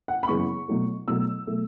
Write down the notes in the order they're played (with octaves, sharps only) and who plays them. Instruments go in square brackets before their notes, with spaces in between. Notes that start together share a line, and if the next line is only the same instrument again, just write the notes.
[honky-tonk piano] F#5
B5
F#2 C#3 E3 G#3 B3 C#6
B2 F#3 A3
B2 F#3 A3 E6
B2 F#3 A3